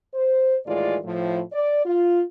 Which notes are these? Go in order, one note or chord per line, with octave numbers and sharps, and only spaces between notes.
C5
D#2 A2 E3 G#3 F4 D5
A2 F3
D5
F4